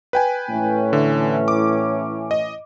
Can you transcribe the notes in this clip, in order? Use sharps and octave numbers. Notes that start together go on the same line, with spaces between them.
B4 G5 G#5
A2 E3 C#4
D3
D6
D#5